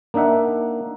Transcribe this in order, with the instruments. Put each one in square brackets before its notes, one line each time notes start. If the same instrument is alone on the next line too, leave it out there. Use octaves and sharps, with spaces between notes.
[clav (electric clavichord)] A#3 D4 D#4 E5 F#5